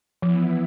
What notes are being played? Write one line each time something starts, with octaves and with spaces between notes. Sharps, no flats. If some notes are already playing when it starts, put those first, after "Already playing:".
E3 F3 B3 E4